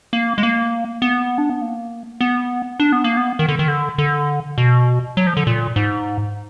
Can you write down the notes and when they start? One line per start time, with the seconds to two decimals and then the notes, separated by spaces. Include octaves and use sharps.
0.13 A#3
0.38 G#3
0.43 A#3
1.02 B3
1.38 D4
1.50 B3
1.62 A#3
2.21 B3
2.80 D4
2.92 B3
3.04 A#3
3.17 B3
3.39 D#3
3.49 D3
3.59 D#3
3.68 D3
3.98 D3
4.58 B2
5.17 F#3
5.27 F3
5.37 D3
5.47 A#2
5.76 G#2